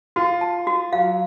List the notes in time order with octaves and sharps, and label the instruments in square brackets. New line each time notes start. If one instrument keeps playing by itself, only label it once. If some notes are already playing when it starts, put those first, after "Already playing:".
[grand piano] F4 [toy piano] F#4
[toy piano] A5
F#4
[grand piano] F#3 [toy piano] F5